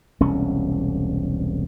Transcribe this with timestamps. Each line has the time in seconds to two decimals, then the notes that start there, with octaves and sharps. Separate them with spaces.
0.20 E1 C2 C#4